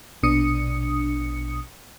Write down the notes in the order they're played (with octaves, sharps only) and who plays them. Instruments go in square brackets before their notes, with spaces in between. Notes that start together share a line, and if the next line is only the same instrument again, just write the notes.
[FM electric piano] A#1 B2 D4 D#6 C#7